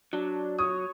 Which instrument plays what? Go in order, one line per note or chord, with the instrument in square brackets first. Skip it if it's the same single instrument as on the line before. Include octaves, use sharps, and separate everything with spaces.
[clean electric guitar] F#3 [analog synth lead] D4
[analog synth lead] C#5 [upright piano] D#6